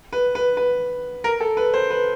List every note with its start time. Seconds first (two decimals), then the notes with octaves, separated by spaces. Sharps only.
0.13 B4
0.35 B4
0.57 B4
1.24 A#4
1.40 A4
1.57 B4
1.74 C5
1.90 B4